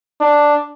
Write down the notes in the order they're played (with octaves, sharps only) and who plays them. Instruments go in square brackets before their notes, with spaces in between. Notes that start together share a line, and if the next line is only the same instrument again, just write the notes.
[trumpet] D4